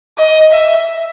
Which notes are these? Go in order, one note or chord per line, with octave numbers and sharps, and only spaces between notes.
D#5
E5